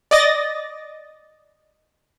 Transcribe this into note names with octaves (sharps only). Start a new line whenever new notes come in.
D5 D#5 A6 A#6